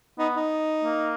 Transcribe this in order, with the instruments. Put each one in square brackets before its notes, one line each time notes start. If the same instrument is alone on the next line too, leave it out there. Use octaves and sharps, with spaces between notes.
[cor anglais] B3 [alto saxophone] D#4
[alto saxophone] D#4
[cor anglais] A#3